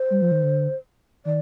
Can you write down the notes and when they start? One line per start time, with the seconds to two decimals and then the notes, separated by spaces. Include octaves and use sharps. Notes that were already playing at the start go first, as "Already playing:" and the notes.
Already playing: C5
0.10 G3
0.22 F3
0.32 D#3
0.43 D3
1.25 D#3 D5